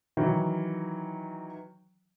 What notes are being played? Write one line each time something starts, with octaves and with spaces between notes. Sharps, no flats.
D#3 E3 F#3